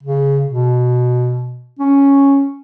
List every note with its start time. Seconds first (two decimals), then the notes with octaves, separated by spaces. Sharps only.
0.03 C#3
0.47 B2
1.79 C#4